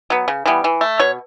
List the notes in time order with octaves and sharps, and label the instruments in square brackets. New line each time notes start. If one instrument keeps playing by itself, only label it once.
[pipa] F#3 B3
C#3
E3 G3 B3
E3
A3
B2 C#5